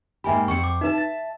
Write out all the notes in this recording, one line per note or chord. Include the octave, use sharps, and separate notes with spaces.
G#2 A#3 G4 E5 G#5 B5
F2 C4 F#5 C#6 C#7
D6
D#4 B4 E5 A5
A6